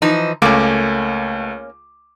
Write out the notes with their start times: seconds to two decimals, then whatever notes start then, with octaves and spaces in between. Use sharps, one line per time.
0.02 E3 F3 D#4
0.42 C#2 A3 A#3 C#4 D6